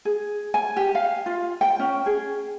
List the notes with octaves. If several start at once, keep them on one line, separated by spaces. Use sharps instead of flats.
G#4
G#5
G4
F5
F4
G5
C#4
G#4